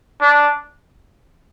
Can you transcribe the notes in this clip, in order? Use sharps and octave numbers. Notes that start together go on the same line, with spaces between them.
D4